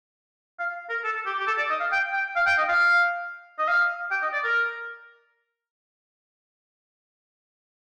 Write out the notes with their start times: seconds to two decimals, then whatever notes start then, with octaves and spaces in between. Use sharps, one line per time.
0.59 F5
0.90 A#4
1.04 A4
1.26 G4
1.39 G4
1.47 A4
1.58 D5
1.70 D#5
1.80 F5
1.92 G5
2.13 G5
2.36 F5
2.46 G5
2.58 D#5
2.69 F5
3.59 D#5
3.68 F5
4.11 G5
4.22 D#5
4.33 D5
4.44 A#4